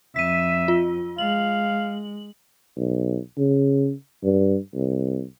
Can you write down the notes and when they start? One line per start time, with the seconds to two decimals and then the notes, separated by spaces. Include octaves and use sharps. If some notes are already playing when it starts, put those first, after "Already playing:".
0.16 F2 E5 B6 D#7
0.68 F4
1.18 G#3 F5 F#7
2.76 B1
3.37 C#3
4.23 G2
4.74 C2